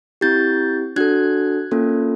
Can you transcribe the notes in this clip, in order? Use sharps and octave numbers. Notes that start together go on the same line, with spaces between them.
C4 E4 G4 G6 A6
D4 F#4 A4 F#6 G#6
A#3 C#4 F4 A4